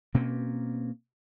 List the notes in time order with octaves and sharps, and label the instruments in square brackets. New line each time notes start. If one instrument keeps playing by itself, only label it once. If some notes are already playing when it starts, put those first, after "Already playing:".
[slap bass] B2 A#3 C4 C#4